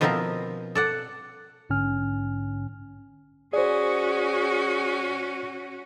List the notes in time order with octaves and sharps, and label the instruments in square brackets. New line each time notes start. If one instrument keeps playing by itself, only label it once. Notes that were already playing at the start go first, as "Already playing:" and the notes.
[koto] B2 F3 B3 C4 E4 A#4
A4 D5 F#5
[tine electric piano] A#1 G#2 D3 C#4 G#5 F6
[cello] C#4 F#4 [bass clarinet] G#4 [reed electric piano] C5 D5